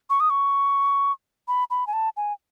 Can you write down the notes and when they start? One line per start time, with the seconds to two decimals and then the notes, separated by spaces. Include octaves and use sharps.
0.10 C#6
0.20 D#6
0.30 C#6
1.48 B5
1.70 B5
1.87 G#5
1.93 A5
2.17 G#5